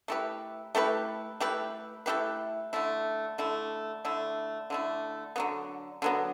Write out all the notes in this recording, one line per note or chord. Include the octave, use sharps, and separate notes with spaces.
A3 E4 G4 B4
A3 E4 G4 B4
A3 E4 G4 B4
A3 E4 G4 B4
D3 A3 E4
D3 A3 E4
D3 A3 E4
D3 A3 E4
D3 F#3 B3
D3 F#3 B3